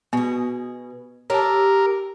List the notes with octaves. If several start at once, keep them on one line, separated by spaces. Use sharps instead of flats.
B2 B3 G#4
G4 A4 A#4 C#5 A5